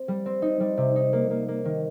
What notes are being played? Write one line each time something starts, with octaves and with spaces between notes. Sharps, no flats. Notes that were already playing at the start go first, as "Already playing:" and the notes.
Already playing: C4
G3
C4
D#4
G3
C3
D#4
A#3
A#3
A#3
D#3